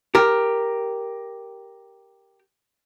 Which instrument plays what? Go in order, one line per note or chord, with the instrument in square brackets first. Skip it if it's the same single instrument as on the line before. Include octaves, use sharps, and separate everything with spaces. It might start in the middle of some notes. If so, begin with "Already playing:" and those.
[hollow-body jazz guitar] G4 A#4